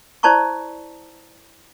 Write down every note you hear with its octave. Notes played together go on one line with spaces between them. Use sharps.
E4 C5 D5 A5 A#5 C#6